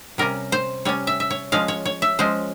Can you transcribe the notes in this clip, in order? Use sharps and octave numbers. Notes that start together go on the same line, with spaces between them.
C3 G3 C#4 A#4
C5
C3 G3 C#4 C#5
E5
E5
C#5
F3 G#3 C#4 F5
C#5
C#5
E5
F3 G#3 C#4 C5